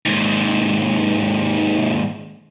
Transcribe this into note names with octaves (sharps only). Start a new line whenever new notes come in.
D#2 G#2